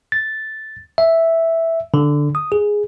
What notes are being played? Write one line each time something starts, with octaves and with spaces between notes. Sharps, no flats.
A6
E5
D3
D#6
G#4